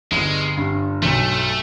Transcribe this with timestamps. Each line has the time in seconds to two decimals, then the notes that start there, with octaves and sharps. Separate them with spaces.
0.11 G1 G#3
0.57 G2
1.02 B1 A3